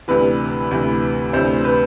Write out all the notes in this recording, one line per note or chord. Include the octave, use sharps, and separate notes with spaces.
D2 C3 E3 B4
D2 C3 E3
D2 C3 E3 C5
B4